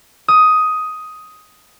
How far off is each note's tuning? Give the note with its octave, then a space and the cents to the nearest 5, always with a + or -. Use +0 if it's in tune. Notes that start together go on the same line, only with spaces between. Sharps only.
D#6 +10